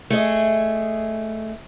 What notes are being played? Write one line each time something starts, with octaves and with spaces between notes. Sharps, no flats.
A3 G#4 D#5